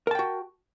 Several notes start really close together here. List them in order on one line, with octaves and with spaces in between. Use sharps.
A#4 A5 G5 F#4